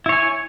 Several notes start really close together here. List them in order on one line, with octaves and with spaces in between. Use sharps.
E4 C#5 G#5